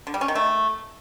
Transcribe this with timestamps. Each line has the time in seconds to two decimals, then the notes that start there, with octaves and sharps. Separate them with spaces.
0.07 D3
0.14 G3
0.21 C#4
0.28 D#3
0.35 A3